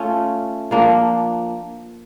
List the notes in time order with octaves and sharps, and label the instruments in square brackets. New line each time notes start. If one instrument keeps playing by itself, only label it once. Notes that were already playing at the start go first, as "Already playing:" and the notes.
Already playing: [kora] A3 C#4 F4
F3 A#3 D4